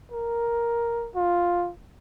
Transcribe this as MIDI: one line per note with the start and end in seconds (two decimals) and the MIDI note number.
0.12 1.10 70
1.15 1.71 65